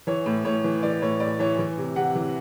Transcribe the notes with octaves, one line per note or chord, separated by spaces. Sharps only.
E3 C#5
A2
A2 C#5
E3
E3 D5
A2 C#5
A2 D5
E3 C#5
E3
C3
C3 F#5
E3